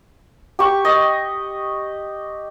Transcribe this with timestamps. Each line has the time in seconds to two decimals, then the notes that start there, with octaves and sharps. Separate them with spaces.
0.59 G4 C#6
0.85 D#5